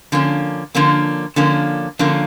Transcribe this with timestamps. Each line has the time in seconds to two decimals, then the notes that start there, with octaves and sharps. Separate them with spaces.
0.12 D3 F3 A#3 C#4
0.75 D3 F3 A#3 C#4
1.36 D3 F3 A#3 C#4
1.99 D3 F3 A#3 C#4